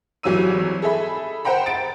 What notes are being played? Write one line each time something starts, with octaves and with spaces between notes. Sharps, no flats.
G#1 E3 F#3 G3 E6 D#7
G#4 A4 E5 B5
C5 F#5 G5 A#5 B5
A6 D7